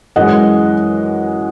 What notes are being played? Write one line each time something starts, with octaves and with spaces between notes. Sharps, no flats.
F#2 E3 G#3 D#5 F#5